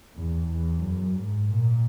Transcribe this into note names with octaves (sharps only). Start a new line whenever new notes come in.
E2
E2
F#2
G#2
A#2